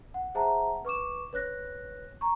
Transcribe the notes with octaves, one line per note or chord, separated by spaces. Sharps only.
F#5
G#4 C5 E5 F#5 A5 A#5
B4 C#6 D6 E7
B4 C#5 F#6 A#6
A#5 C#6